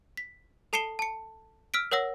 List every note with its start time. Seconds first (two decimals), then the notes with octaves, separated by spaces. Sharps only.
0.17 B6
0.73 A4 A5 C7 C#7 E7 G7
0.99 A5 C#7
1.74 E6 F6 B6 D7
1.91 A#4 C#5 F#5 E6 A#6